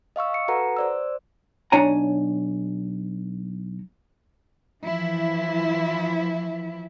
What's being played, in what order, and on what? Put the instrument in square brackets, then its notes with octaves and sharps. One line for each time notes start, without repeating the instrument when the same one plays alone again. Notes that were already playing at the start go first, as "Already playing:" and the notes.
[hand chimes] D#5 F5 C#6 E6
C#7
F#4 A4 B4 F#5 A#5
C5 D5 E6
[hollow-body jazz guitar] B1 D4 C#5 G#5 A#5
[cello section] E3 F3 E4